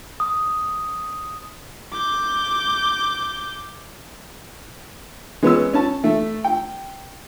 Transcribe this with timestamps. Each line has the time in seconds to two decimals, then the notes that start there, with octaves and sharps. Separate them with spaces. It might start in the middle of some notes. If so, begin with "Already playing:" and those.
0.20 D#6
1.93 D6 G6
5.43 G#3 B3 C#4 E6
5.73 C#4 A5
6.04 A3
6.44 G5